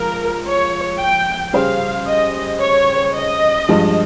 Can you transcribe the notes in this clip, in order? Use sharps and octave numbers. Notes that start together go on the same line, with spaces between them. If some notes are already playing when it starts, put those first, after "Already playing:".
Already playing: F3 G#3 A#4
C#5
G5
C#3 G3 C#4 G#4 C5 F5
D#5
C#5
D#5
G2 F3 G#3